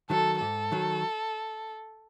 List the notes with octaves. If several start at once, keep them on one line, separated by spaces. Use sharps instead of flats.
D#3 F#3 A4
G#2 A4
D#3 F#3